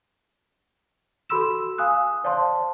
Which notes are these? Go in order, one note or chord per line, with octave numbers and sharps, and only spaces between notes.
F#4 A4 B5 C6 E6 E7
F5 G#5 D#6 F#6
C5 D5 F5 A5 C6